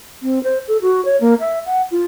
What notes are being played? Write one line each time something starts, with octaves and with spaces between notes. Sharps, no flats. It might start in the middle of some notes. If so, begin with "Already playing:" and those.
C4
C5
A4
F#4
C#5
A#3
E5
F#5
F4